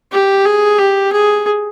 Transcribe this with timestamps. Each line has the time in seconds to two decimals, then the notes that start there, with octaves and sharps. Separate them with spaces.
0.12 G4
0.46 G#4
0.79 G4
1.12 G#4